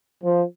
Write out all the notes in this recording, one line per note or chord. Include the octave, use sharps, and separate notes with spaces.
F3